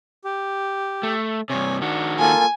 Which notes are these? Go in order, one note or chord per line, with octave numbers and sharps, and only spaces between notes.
G4
A3
G2 C3 C#5 G#5
D#3 D4 F#4
A#3 F4 A4 G#5